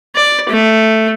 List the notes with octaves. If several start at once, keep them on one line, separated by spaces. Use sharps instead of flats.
D5
A3